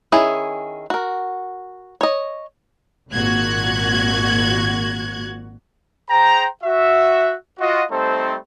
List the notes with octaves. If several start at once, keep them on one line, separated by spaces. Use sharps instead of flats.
D#3 C#4 E4 G#4
F#4 A#4
C#5 D#5
G#1 A#2 F#4 F#6 G#6
G#4 C5 G5 A#5
F#4 E5
F4 F#4 D#5
G3 A3 C4 D#4 A4 C5